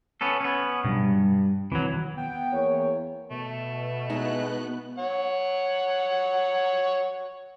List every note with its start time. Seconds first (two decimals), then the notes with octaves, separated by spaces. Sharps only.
0.21 B3 C#4 A4
0.41 B3 C#4
0.85 G2 B2 F#3
1.04 G3
1.72 E1 D#3 E3 F#3 C4
2.16 B3 G5
2.52 E2 A#3 C#5
3.31 B2 A3
4.10 G#3 B3 D#4 F#6
4.98 C#5 F#5